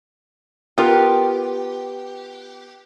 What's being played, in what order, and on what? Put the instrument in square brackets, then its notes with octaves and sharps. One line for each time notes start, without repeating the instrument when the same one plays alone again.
[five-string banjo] B3 F4 A#4 [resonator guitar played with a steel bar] G4